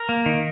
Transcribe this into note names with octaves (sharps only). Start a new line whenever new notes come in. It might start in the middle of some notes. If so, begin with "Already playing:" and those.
Already playing: A#4
A#3
D#3